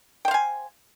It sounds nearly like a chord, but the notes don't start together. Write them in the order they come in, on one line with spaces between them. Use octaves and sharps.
G5 C5 F5 G#5